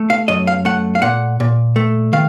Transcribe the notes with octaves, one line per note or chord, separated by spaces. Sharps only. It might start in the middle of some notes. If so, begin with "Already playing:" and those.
Already playing: A3
F5
F#2 D#5
F5
A3 F#5
F5
A#2 F#5
A#2
A3
D#3 F5